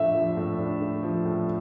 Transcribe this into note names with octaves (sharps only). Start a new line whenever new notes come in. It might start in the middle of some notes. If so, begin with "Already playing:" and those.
Already playing: A2 F3 A3 D4 E5
F3
A2
D4
A3
F3
A2